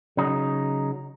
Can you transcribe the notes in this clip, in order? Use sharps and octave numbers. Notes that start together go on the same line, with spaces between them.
C#3 F#3 D#4